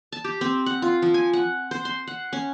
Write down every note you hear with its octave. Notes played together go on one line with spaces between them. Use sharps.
A5
G4
C4
F#5
F4
F3
G#5
F#5
C5
C6
F#5
C#4